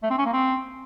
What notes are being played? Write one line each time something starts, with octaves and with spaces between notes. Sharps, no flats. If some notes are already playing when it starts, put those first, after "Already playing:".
A3
C4
C#4
A#3
C4